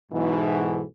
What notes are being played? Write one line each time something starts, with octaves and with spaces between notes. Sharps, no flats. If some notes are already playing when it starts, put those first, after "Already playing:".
B1 G#2 B2 E3